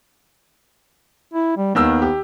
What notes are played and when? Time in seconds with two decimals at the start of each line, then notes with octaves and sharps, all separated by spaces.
1.34 E4
1.57 G3
1.75 D#2 D#3 B3 E6
2.02 G4